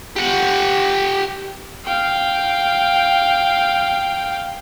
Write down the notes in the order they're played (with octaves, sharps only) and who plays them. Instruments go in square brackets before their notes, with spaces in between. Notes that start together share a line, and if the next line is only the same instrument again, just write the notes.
[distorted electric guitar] G4 F#5
[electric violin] F5 G5